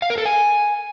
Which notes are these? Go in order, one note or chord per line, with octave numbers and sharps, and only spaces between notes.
F5
A#4
A4
G#5